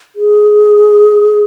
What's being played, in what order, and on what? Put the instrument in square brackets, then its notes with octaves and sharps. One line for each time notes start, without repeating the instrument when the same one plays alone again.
[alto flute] G#4